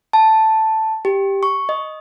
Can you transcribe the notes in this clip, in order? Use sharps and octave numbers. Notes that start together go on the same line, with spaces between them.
A5
G4
C#6
D#5